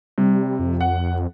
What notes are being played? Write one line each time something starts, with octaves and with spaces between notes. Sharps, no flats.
C3 G3
F2
F#5